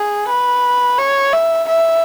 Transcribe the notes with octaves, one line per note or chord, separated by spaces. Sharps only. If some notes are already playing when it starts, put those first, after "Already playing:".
Already playing: G#4
B4
C#5
E5
E5